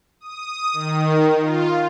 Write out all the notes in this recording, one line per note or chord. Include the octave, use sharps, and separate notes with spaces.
D#6
D#3
F4